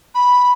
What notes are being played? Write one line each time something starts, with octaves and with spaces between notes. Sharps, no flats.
B5